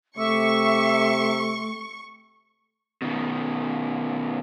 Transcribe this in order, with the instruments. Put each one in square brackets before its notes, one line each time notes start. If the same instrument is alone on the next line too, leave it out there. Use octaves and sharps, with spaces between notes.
[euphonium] C3 [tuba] A3 [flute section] E5 D6 E6 [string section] C#6
[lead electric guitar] B2 D#3